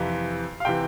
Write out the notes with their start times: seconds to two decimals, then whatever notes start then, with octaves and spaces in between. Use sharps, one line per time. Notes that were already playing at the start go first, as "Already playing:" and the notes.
Already playing: F2 C3 E3 F5
0.60 F5
0.65 C3 E3 G5